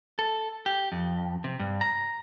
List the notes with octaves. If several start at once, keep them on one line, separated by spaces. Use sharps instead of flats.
A4
G4
F2
C3
G2
A#5